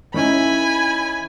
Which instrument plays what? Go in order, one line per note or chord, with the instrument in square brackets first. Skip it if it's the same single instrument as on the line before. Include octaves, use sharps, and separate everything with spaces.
[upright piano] D#3 C#4 E4 [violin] G#5 B5